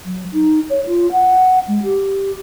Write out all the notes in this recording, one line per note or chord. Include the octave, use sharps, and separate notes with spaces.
F#3
D#4
C#5
F4
F#5
G#3
G4